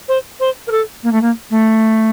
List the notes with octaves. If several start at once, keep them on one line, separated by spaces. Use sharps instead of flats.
C5
C5
A#4
A4
A#3
A3
A#3
A3